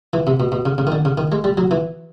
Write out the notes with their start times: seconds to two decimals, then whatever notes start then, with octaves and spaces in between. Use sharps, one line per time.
0.13 E3
0.27 C3
0.40 B2
0.52 B2
0.65 C#3
0.78 C#3
0.87 D#3
0.92 D3
1.05 C#3
1.18 D#3
1.32 G#3
1.44 G3
1.57 F#3
1.71 E3